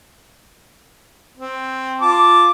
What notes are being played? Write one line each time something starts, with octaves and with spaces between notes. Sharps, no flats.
C4
F4 A5 D6